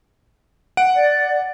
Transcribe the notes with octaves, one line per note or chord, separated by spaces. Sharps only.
F#5 D7
D5